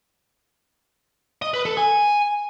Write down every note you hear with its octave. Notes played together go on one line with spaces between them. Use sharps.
D#5
B4
A4
G#5